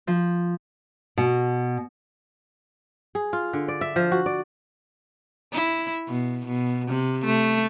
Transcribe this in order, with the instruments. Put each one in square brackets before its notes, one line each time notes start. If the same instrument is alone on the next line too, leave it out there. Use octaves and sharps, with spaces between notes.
[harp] F3
[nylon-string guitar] B2
[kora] G#4
F4
D3
D5
E5
F3
F#4
D5
[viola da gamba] E4
B2
B2
C3
A3